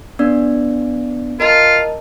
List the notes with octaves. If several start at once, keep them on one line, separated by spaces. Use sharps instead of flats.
B3 D4 D5
F4 A#4 D#5 A5